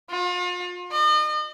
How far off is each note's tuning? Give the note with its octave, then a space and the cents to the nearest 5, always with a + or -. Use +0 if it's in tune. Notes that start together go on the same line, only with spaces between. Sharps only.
F4 +40
D#5 -40